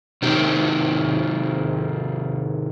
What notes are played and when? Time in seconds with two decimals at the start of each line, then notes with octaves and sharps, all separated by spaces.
0.22 C3 D#3 G4